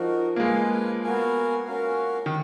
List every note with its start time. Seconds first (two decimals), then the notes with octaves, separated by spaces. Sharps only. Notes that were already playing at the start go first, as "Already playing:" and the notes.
Already playing: F3 D#4 F#4 A#4
0.36 A#3
0.40 G#3 F4 B4 F5 G#5
1.03 B3 F#4 A#4 F5 G#5
1.67 C#4 F#4 A#4 F5
2.26 D#3